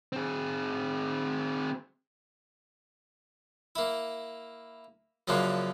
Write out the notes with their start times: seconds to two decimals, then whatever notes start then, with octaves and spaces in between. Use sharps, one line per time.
0.13 C4 G#4
3.76 A#3 E4
5.28 F#2 C#3 F3 A#3 D4